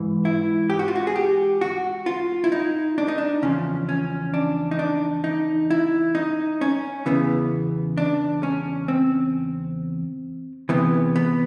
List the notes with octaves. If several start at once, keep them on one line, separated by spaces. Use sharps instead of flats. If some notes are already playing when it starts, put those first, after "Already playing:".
Already playing: G#2 E3
E4
G4
F#4
F4
F#4
G#4
G4
F#4
F4
E4
D#4
D4
D#4
D4
E2 C#3 F3 C#4
C#4
D4
D#4
D4
D#4
E4
D#4
C#4
E2 C#3 E3 B3
D4
C#4
C4
E2 C3 E3 B3
B3